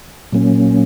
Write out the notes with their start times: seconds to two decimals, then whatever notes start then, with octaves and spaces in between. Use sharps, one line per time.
0.32 A#2 F#3 A#3 C#4